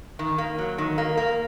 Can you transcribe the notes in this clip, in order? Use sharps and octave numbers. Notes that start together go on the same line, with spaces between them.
D#3
A#3
F#3
D#3
A#3
A#3